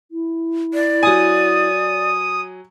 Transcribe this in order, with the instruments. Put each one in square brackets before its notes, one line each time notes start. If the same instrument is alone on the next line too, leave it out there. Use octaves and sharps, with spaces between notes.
[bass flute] E4
[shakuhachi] D5
[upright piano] F#3 G#5 [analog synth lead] D#6